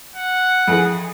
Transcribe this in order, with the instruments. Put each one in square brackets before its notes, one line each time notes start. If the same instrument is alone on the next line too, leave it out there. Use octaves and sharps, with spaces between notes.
[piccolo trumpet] F#5
[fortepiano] F2 E3 G#4